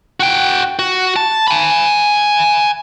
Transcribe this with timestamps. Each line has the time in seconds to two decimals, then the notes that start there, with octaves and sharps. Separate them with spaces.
0.20 F#4 G5
0.79 F#4
1.16 A5
1.48 G#5 B5